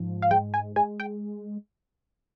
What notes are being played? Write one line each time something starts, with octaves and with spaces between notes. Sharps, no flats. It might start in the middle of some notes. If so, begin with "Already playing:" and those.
Already playing: G#2 F3
F5
G#3 G5
G#5
G#3 G#5
G5